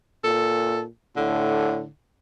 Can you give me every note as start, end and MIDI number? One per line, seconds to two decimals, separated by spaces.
0.24 0.87 46
0.24 0.82 69
1.17 1.85 45
1.17 1.88 50